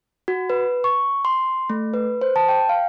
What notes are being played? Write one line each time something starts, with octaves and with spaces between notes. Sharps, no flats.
F#4
B4
C#6
C6
A3
B4
C5
A5
G5
F5